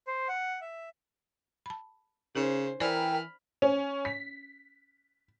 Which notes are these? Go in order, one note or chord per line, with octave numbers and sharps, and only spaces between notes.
C5
F#5
E5
A5 B5
C#3 C#4 D#4 A#4 C5
E3 A#4 C5 D5 G5 G#5 B5 F6
C#4
B6